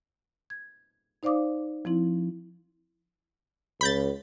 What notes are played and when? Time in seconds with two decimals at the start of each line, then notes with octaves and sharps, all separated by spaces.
0.50 G#6
1.23 D#4 C5 D5 F5 D6 D#6
1.85 F3 C4 E4
3.81 C#2 B5 G6 A6